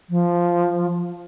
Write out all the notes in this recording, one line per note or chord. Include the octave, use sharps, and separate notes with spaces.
F3